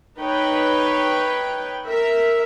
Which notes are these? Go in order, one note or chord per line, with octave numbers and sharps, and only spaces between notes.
D#4 B4 C#5 G5
A#4 E5